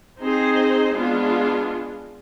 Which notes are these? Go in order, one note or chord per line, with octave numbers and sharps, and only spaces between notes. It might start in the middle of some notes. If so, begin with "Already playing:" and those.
C4 D#4 G#4 C5
G#3 B3 D4 F4